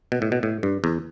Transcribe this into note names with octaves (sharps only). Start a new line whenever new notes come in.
B2
A2
B2
A2
G2
E2